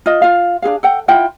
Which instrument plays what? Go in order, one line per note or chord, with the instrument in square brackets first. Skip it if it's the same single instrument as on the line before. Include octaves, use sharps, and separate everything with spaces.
[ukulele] F4 D#5
F4 F5
D4 F4 G#4 F5
A4 F#5 G5
E4 F4 F#5 G5